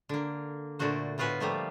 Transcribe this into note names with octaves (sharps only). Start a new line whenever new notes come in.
D3 A#3
A#2 D3 A3 F#4 C5
A2 B3 F4 F#4 B4 G#5
F3 G3 A3 A#3